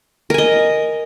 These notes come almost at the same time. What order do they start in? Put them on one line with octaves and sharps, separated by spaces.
A#4 G#5 D#5